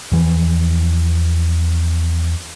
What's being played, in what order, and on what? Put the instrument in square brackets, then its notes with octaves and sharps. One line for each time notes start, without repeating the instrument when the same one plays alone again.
[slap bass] E2 E3 F3